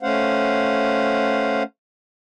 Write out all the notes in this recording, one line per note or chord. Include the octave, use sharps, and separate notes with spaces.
A3 C#4 C5 F5 F#5